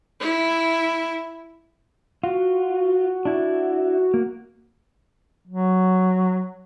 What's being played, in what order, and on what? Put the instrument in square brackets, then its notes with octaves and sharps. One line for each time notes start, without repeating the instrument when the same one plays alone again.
[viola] E4
[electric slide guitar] F4 [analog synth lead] F#4
[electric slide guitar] D4 E4
A#3
[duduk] F#3